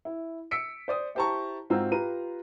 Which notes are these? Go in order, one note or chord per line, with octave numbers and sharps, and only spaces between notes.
E4
E6 B6 C#7 D7
C5 D5 D#6
E4 G4 C5 A5 A#5 C#6
G#2 C4 F4 F#4 A#5 E6
F4 G4 B4 A#5 D#7